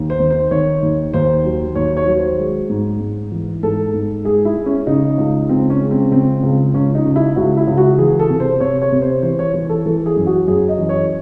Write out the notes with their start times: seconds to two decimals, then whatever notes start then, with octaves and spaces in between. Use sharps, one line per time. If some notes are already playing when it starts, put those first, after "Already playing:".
Already playing: D#2
0.10 C5
0.20 D#3
0.31 C5
0.51 D#3 C#5
0.83 D#2
1.14 D#2 C5
1.45 F#3
1.75 D#2 C#5
1.97 C#5
2.06 F#3
2.17 C5
2.38 G#3
2.70 G#2
3.01 G#2
3.32 E3
3.63 G#2 A4
3.94 G#2
4.25 G#3 G#4
4.45 E4
4.56 G#3
4.66 C#4
4.87 C#3 D#4
5.18 C#2
5.49 C#2 C4
5.70 C#4
5.81 G#3
5.91 C4
6.11 C#3 C4
6.43 C#2
6.74 C#2 C#4
6.95 D#4
7.05 C#3
7.16 E4
7.36 C#2 F#4
7.57 E4
7.67 C#2
7.77 F#4
7.98 E3 G#4
8.19 A4
8.30 C3
8.40 C5
8.60 C3 C#5
8.82 C#5
8.92 C3
9.02 C5
9.23 E3 C5
9.39 C#5
9.54 E3
9.69 A4
9.86 E3 A4
10.06 G#4
10.16 F#2
10.27 F#4
10.48 F#2 G#4
10.69 D#5
10.79 E3
10.89 C#5